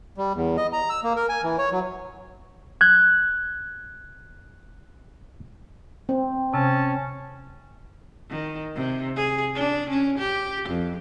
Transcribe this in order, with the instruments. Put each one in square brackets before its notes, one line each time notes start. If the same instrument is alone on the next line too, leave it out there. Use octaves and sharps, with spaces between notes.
[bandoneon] G3
E2
D#5
A#5
E6
A#3
A#4
G#5
E3
C#5
F#3
[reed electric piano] F#6 G#6
[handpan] C4
[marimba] C3 [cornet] C#4 [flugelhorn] A5
[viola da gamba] D#3
C3
G#4
D4
C#4
G4
F2